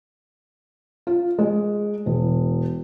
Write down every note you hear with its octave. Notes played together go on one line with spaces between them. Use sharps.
F4
G#3
E1